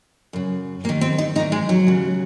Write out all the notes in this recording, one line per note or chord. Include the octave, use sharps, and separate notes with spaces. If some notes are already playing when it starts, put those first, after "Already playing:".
F#2 C#3
D#2 A#3
D#3
C4
D#4
G#2 D#3 D#4
G#3
F#3
D#2 C#3